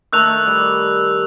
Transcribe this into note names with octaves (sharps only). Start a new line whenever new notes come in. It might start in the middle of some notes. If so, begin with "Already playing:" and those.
D#3 A3 E6 F#6 F7
G3